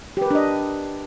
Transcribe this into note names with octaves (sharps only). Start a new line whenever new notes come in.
D4 G4 A#4 B4 D#5